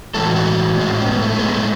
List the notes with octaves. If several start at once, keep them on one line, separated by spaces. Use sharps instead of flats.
A2 E3 G#3 A4
F#4
F#4
A2 G#3
C#4
B3
A3
A2 G#3 B3
A3